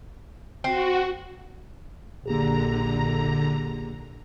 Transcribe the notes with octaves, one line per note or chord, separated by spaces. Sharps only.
C4 F#4
A#1 D3 A#3 G4 G#4 A#5